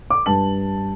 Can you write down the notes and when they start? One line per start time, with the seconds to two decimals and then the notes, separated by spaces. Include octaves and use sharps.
0.10 D6
0.26 G2 A5 F#7